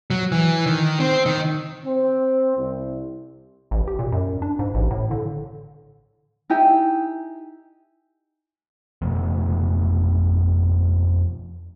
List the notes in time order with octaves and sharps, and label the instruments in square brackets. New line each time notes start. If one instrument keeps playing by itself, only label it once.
[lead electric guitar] F#3
E3
D#3
C4
D#3
[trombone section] C4
C2
[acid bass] A1
G4
A#2
F#2
D4
G#2
A1
A2
D3
[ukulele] D#4 E4 G4 G#5
[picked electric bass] F2 B2 F3 A3